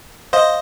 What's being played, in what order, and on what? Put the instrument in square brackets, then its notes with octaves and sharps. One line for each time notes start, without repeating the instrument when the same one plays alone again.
[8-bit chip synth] C5 D#5 [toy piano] F5